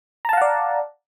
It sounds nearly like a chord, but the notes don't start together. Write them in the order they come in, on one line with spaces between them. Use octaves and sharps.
A#5 A5 F5 F#5 D5